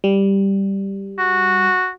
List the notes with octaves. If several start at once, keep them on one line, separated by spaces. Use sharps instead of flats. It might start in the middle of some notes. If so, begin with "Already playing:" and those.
G3
F#4